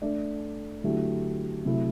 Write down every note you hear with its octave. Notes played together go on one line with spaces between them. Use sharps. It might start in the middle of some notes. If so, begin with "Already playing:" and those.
A3 D4 A4 D5
D3 F#3 A3 E4 G4
C3 F#3 A3 E4